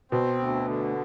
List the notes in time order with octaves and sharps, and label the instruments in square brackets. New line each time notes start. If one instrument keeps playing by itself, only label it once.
[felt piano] B2 [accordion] C4
[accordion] D2
D3